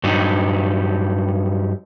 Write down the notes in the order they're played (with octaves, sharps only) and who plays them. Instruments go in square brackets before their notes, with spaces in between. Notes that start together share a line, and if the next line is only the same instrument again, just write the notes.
[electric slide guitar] G2 F#3 D#4